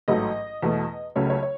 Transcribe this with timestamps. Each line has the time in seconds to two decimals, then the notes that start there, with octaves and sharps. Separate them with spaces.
0.08 A1 G#2 F#3 A3 D#5
0.62 E2 B2 A3
1.16 C#2 C#3 F#3 A3 C#5
1.30 C#5
1.42 C#5